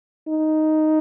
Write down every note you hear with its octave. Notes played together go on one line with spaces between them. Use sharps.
D#4